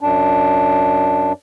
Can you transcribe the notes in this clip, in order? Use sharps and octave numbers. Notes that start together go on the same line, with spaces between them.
F#2 D4